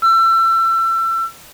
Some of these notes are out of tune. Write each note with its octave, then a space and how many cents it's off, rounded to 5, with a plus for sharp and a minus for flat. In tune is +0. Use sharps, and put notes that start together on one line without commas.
E6 +30